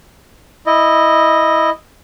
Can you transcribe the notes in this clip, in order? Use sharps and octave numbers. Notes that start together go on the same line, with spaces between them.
E4 D#5